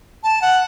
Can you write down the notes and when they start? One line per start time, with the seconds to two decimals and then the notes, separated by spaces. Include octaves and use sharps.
0.23 A5
0.42 F#5